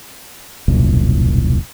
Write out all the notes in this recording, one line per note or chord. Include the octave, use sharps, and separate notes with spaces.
E1 C2 F#2 A#2